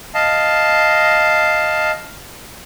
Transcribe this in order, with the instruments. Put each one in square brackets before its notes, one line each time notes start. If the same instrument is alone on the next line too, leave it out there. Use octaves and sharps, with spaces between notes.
[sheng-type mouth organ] D#5 F5 A5